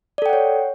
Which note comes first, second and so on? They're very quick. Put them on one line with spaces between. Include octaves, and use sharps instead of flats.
D5 A4 G5 F#5 C#5